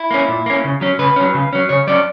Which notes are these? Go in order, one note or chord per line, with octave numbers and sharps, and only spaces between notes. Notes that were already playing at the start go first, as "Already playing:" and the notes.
Already playing: E4
A#3 C#4
A#2
A#3 C#4
C#3
F#3 C#4
C#3 B4
F#3 C#4
C#3
F#3 C#4
C#3 C#5
F#3 C#4 D5